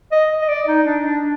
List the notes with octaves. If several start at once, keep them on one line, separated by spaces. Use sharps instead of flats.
D#5
D#5
D5
D#4
D4
D4